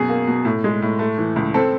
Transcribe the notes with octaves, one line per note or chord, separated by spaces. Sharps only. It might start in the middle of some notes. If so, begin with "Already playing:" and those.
Already playing: F#2 B2 G#4
A#3
B2
A2
G#3
A2
A3
E3
C#2
C4 A4